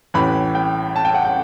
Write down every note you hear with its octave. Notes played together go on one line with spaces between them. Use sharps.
A1 A2 E3 B5
G5
A5
G5
F#5
G5